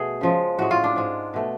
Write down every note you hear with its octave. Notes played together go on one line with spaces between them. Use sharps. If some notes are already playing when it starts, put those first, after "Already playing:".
Already playing: B2 A3 G#4
C#3 F3 G#3
A2 G#3 F#4
F4
D4
G#2 G#3
B2 A3